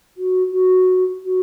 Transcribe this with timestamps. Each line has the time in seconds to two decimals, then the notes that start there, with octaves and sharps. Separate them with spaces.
0.17 F#4
0.53 F#4
1.25 F#4